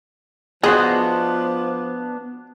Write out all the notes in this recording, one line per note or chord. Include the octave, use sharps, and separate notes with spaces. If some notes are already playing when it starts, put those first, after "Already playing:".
F3 B3 D4 F#4 G#4 C5 D#5